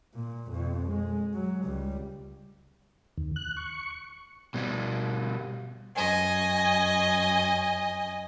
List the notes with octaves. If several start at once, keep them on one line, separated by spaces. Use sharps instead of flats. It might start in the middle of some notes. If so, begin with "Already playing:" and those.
A#2
F2 B2
G#3
F#3
C#2 G3
D#2
F#6
C#6
B2 G3
F#2 D#5 G#5